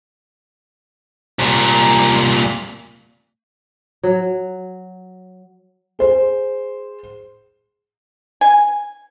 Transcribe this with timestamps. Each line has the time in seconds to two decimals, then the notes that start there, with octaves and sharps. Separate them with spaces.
1.39 C2 A#2
4.03 F#3
5.99 G#4 C5
8.41 G#5